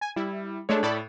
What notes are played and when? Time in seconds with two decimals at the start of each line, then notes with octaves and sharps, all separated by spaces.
0.01 G#5
0.16 G3 E4
0.69 G#3 A3 D4 C#5
0.83 A2 A4 D5 B5